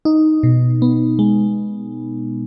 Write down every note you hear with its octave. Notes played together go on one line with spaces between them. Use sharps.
D#4
B2
B3
G#3